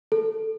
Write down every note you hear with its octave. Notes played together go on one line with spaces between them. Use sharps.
A4